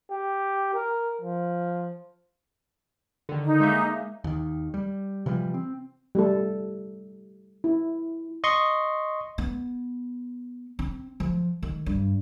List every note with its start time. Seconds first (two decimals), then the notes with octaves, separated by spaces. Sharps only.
0.10 G4
0.74 A#4
1.21 F3
3.29 D3 D#3
3.44 D#4
3.60 G#3 A#3 E5
4.24 D#2 D#3
4.74 G3
5.26 C3 E3 F3 G3
5.54 C4
6.15 G3 A3 A4
7.64 E4
8.44 D#5 C6 C#6
9.38 B3
10.79 C4
11.20 F3
11.63 D#3
11.86 G2